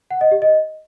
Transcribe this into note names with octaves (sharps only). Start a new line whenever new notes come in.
F#5
D#5
G4
D#5